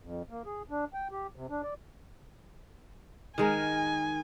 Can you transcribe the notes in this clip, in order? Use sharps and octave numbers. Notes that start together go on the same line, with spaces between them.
F2
A#3
G#4
D4
G5
G4
C3
D4
D5
D#3 G#3 A#4 G#5